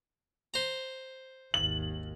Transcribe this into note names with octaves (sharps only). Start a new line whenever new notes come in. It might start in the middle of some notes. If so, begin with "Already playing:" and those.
C5 A#5
G#1 D#2 F#7